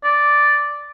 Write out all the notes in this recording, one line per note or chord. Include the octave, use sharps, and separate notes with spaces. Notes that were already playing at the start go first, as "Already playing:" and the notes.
D5